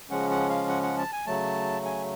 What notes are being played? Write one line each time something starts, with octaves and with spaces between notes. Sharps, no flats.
C#3 F3 G#3 C#4 F#5
F#5
F5
F#5
F#5
A5
G#5
C#3 F#3 A3 A5
G#5